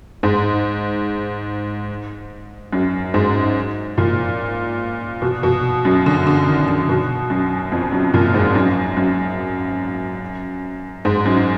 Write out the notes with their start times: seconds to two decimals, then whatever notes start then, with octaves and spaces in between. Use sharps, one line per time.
0.23 G#2
2.73 F#2
3.14 G#2
3.98 A#2
5.22 B2
5.43 B2
5.85 F#2
6.06 D3
6.27 D3
6.48 D#3
6.68 D3
6.89 B2
7.30 F#2
7.72 F2
7.92 F#2
8.14 A#2
8.34 G#2
8.55 F#2
8.97 F#2
11.05 G#2
11.26 F#2